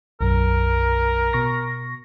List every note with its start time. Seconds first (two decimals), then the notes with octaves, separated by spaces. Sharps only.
0.21 B1 F#2 A#4
1.33 B2 C#6 A#6